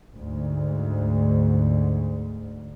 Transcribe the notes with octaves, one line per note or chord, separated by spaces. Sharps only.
D2 G#2